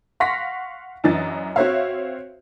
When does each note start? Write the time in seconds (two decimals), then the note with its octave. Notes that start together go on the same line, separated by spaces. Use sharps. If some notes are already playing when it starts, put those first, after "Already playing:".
0.20 F5 F#5 C6 C#6 A#6 B6
1.04 F#2 E3 D4 D#5 A6
1.56 C4 F#4 C5 C#5 E5 F5